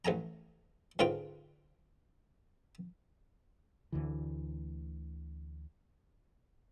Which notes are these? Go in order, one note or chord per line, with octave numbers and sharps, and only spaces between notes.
A1 A3 G#5 A#5
C#2 G#2 D3 F4 B4 G5
D2 D3 E3